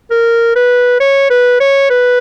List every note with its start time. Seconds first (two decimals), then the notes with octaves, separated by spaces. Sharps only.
0.11 A#4
0.55 B4
1.00 C#5
1.30 B4
1.60 C#5
1.90 B4